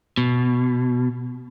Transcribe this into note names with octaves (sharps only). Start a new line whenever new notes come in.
B2